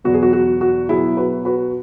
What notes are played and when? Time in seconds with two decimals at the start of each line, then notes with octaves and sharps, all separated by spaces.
0.04 E2 B2 F#3 B3 F#4
0.14 G#4
0.22 F#4
0.33 F#4
0.61 F#4
0.89 B2 F#3 B3 E4 G#4
1.17 F#4 B4
1.45 F#4 B4